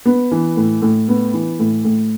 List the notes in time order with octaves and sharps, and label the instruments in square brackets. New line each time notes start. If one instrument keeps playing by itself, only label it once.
[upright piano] B3
E3
A2
A2
B3
E3
A2
A2